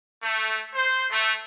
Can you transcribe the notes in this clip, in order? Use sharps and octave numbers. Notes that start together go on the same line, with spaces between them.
A3
C5
A3